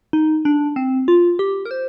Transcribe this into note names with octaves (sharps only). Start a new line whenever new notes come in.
D#4
D4
C4
F4
G4
A#4
C5